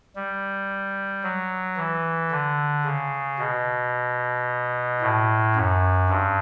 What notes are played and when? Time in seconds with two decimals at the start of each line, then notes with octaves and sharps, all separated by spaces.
0.16 G3
1.23 F#3
1.77 E3
2.31 D3
2.85 C#3
3.39 B2
5.02 A2
5.56 F#2
6.09 G2